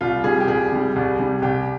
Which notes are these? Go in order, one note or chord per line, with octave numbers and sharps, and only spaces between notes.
C2 F4
C3 G3 G#4
G4
C2 G#4
C3 G3
C2
C3 G3
C2 G4